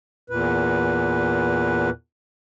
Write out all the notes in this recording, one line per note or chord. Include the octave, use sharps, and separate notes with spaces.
E2 A#2 B4